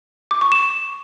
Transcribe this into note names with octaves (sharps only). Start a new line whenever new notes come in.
D6
C#6
E7